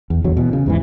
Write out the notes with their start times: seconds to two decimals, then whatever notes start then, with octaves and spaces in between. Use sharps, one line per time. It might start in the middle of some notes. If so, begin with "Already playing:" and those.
0.10 E2
0.24 E2 D3 F#3
0.37 B2 E3
0.53 C#3
0.66 D#2 G#2 E3